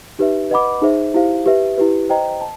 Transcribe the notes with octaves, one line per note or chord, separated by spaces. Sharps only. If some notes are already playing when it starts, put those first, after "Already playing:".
D#4 G4 B4 E5
B4 D#5 F#5 B5 D6
D#4 G#4 C5 E5
E4 G4 C5 F5
G4 B4 E5
E4 G4 B4
C5 D#5 G5 A#5
A5